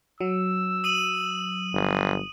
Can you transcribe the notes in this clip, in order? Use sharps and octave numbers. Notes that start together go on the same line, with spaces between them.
F#3 E6
D#6 D#7 F#7
G1